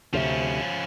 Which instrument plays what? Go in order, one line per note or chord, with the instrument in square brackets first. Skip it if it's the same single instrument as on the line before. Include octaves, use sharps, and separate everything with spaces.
[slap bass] D2 C3 [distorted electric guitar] F3 C#4